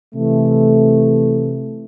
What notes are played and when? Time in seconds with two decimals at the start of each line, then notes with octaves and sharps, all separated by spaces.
0.15 C3 E3 A3